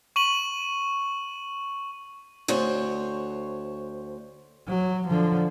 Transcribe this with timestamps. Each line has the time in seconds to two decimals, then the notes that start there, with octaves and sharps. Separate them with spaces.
0.16 C#6 D#7 F#7
2.48 D2 F#4 C5 C#5
4.68 F#3
5.07 D3 F3